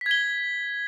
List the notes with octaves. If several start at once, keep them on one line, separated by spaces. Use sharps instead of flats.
G#6 B6 G7